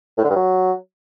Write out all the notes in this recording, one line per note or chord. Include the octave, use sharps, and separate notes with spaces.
A2
D3
G2
F#3